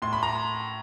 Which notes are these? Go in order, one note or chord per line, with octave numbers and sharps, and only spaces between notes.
A2 C6
B5
A#5